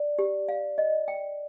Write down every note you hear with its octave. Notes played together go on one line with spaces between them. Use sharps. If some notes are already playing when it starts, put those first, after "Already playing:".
Already playing: D5
G4
F5
D#5
G5